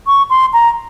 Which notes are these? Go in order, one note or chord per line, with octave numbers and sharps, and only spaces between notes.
C#6
C6
A#5